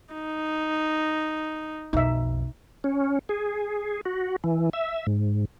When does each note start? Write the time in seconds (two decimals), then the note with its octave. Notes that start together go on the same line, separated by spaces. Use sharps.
0.14 D#4
1.93 B1 F2 D#4 E5
2.84 C#4
3.29 G#4
4.05 F#4
4.44 E3
4.73 E5
5.07 G#2